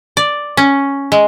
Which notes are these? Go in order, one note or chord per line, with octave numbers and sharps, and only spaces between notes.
D5
C#4
G#3